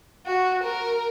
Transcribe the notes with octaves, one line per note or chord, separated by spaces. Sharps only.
F#4
A#4